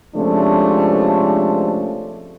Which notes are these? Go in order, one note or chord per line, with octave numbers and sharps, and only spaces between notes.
C3 F3 G#3 A3 C#4 D4